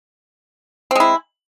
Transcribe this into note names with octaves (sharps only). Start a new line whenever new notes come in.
G#3 C4 E4